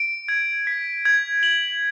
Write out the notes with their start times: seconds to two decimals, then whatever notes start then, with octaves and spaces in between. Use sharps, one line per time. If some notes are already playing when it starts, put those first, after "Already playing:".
Already playing: D7
0.28 G#6
0.67 B6
1.05 G#6
1.43 F#7